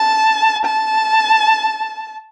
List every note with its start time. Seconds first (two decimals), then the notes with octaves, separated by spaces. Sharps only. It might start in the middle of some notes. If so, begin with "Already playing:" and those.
Already playing: A5
0.65 A5